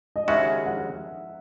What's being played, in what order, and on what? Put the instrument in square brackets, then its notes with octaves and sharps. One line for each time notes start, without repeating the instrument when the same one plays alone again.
[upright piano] D#5
[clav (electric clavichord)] D#2 C#3 G#3 C#4 F#4 [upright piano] E5
[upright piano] F#5